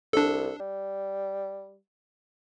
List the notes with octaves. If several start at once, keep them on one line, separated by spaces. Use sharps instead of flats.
C2 D4 A4
G3